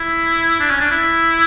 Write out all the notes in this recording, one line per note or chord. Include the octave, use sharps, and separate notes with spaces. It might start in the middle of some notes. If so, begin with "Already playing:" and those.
Already playing: E4
D4
C#4
D4
E4